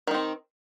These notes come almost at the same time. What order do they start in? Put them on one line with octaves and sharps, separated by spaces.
D#3 D#4 C4